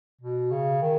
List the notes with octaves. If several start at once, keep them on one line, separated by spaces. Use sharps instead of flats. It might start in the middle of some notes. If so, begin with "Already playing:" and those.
B2
C#3
D#3